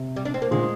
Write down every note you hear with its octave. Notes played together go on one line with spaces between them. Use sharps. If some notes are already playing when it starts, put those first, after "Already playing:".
Already playing: C3
G3
D4
C4
A#3
A#2 D3 G#3